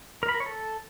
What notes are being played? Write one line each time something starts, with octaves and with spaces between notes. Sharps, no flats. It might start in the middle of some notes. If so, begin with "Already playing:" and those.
A#4
B5
A#4
C#5
A4